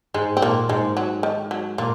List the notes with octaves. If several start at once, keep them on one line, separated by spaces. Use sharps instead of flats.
G#2 G#3
C4
A#2 A#3
G#2 G#3
F#3
D#3
F#3
A#2 A#3